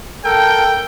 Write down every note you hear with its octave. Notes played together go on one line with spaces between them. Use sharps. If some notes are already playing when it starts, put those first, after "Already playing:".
A4 A#4 G5